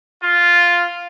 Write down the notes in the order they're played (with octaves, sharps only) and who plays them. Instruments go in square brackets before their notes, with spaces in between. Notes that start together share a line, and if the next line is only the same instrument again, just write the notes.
[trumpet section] F4